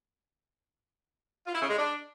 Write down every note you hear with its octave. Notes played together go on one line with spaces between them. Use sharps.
F4
E4
C#3
G#3
D4